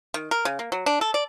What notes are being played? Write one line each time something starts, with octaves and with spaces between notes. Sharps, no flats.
D#3
A#4
C#3
A#3
F#3
D4
A4
D5